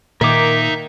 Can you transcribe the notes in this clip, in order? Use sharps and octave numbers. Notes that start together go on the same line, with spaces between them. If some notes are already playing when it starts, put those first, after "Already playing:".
A#2 D#3 A#3 D#4 A#4 E5 D6